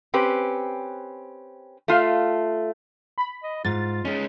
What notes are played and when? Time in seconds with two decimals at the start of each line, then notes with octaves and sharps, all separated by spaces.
0.14 C4 C#4 G4 B4
1.88 A3 F4 F5
3.18 B5
3.43 D#5
3.65 G#2 F4 A6
4.05 G#3 C#4 D#4